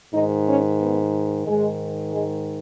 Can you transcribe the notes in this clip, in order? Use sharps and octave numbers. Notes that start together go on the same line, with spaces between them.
G#2 D#3 D#4
C#4
B3
G#2 D#3 G#3
G#3